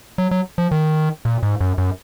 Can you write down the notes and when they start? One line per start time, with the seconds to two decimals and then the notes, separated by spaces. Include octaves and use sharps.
0.18 F#3
0.31 F#3
0.58 F3
0.71 D#3
1.25 A#2
1.43 G#2
1.61 F#2
1.78 F#2